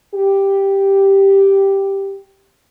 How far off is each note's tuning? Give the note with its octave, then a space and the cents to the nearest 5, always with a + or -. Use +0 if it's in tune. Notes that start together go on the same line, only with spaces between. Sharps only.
G4 +0